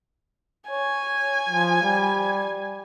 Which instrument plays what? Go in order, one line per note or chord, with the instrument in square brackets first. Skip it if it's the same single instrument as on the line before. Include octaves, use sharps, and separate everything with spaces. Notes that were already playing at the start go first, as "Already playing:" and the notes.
[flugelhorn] C#5 [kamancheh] G#5
[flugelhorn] F3
G3